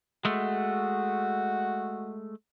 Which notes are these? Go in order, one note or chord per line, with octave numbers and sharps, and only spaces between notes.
G#3 A3 F#4